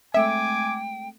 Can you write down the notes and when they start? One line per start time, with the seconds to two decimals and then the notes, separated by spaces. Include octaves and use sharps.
0.14 G#3 A3 C4 E5 G5 G#5 D6